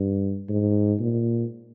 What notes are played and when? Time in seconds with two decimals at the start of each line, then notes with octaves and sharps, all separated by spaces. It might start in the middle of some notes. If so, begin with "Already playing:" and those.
Already playing: G2
0.49 G#2
1.00 A#2